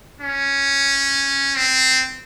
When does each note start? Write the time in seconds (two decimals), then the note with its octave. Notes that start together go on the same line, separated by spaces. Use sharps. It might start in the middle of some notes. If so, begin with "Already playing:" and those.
0.21 C#4
1.56 C4